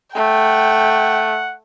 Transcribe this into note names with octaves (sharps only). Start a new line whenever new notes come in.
A3 F#5 G5